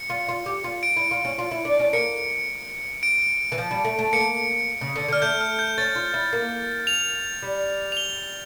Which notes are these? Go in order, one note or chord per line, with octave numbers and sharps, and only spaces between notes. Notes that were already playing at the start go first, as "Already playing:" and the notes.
Already playing: C#7
F4
F4
G4
F4
D7
E4
F4
C#4
F4
E4
D4
C#4
A#3 C#7
D7
E3
F3
G3
A3
A3
A#3 C#7
C#3
D3
D3 F6
A3 G6
F6
G6
C#4 A6
F4
E4
A#3
F7
G3
F7
G7